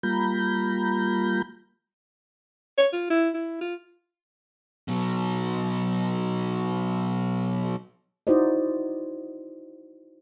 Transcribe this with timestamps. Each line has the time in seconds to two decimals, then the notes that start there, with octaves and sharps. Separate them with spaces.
0.03 G3 A#3 F4 A#5 B5 G6
2.78 C#5
2.93 F4
3.10 E4
3.34 E4
3.61 F4
4.88 B2 F#3
8.27 D#4 E4 F#4 C5 D5 D#5